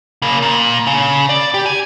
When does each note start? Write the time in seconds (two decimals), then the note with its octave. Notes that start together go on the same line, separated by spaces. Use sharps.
0.22 C#3 A#3
0.42 A#2
0.87 C#3
1.29 D5
1.54 G4
1.66 G#5